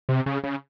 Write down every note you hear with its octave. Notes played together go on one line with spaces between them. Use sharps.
C3
C#3
C#3